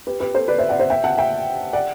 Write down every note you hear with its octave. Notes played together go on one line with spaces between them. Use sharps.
G4 B4
G4 B4
A4 C5
B4 D5
C5 E5
D5 F#5
C5 E5
E5 G5
F#5 A5
E5 G5
D5 F#5